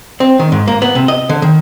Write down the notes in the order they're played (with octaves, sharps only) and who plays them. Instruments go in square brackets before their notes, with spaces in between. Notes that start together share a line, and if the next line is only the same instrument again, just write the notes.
[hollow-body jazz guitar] C4
D#3
G#2
A#3
B3
C3
D#5
D3
D#3